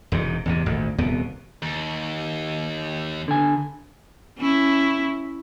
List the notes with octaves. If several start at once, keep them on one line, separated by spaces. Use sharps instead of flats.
E1 G#2 C3
E2 G#2 C3
G#1 D2 A#2
D#1 C2 B2 B3
D#2
D3 G#5
C#4 E4